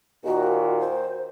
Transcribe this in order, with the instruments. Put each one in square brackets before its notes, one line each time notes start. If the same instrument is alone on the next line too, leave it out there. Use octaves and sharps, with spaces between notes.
[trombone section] D#2 A#2 D#3 [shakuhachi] F#4
[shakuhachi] C5